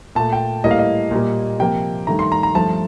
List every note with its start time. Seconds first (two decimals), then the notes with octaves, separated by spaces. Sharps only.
0.15 A#2 A3 A5
0.33 G5
0.64 A2 G3 A#3 D#5
0.71 F5
0.79 D#5
1.11 A#2 G3 A#3
1.59 C3 F3 A#3 G5
2.07 G2 D#3 A3 A#5
2.19 C6
2.32 A#5
2.43 A#5
2.54 G2 F3 A3 A5